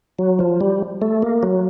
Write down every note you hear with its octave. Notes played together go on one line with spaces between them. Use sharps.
F#3
F3
G3
A3
A#3
F#3